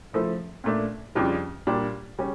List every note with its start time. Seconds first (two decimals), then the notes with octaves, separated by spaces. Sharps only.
0.13 C#3 F3 A3 E4 A4
0.64 A#2 A3 D4
1.15 F2 C#3 G3 D4 F4
1.67 A#2 G3 D4
2.18 C#3 G3 C#4